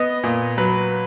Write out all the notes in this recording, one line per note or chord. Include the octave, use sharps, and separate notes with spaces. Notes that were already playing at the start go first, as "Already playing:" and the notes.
Already playing: B3 D#5
A#2
F#3 B4